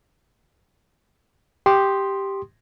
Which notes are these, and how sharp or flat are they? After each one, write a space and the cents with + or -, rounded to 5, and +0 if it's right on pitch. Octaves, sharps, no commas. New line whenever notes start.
G4 +0 C6 +5 D#6 -15